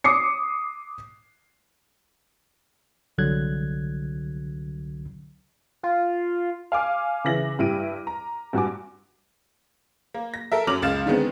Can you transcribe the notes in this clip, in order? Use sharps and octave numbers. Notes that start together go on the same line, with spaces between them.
D6 D#6 C7 C#7
C2 D3 F#3 F#6 G#6
F4
F5 G#5 D6 F6
C#3 E3 E5 A#6 F#7
G2 E4 G4 F6 D7 D#7
A#5
G2 F#4 G#5 D6
A#3
A#6
A4 A#4 E5
F#2 F#3 D6 F6 F7 F#7
C#2 F5 A6 E7
D3 D#3 G#3 B3 C4